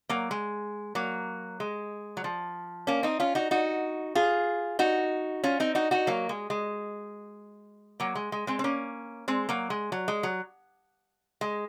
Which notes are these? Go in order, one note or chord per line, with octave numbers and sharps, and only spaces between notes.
F#3 A#3
G#3
F#3 A#3
G#3
F#3
F3
A#3 C#4
C4 D#4
C#4 F4
D#4 F#4
D#4 F#4
F4 G#4
D#4 F#4
C#4 F4
C4 D#4
D#4 F#4
D#4 F#4
F#3 A#3
G#3
G#3
F#3 A#3
G#3
G#3
G#3 C4
C4
A#3 C#4
G#3 C4
F#3 A#3
G#3
F#3
G#3
F#3
G#3